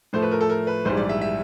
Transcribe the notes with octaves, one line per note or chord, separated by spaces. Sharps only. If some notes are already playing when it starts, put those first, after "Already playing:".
A2 F3 A3 C5
B4
A#4
A4
A#4
B4
A#1 G#2 E3 G3 C5
D5
E5
E5